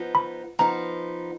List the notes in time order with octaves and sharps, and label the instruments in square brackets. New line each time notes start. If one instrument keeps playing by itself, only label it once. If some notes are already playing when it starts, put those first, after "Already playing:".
Already playing: [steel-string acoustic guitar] F3 B3 D#4
[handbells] B5
[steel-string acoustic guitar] F3 B3 D#4 [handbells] A#5